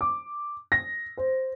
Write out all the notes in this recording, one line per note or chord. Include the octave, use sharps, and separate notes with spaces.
D6
A#6
C5